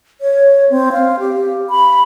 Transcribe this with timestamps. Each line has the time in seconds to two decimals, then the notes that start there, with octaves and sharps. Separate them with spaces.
0.21 C#5
0.70 C4
0.93 F5
1.19 G4
1.70 B5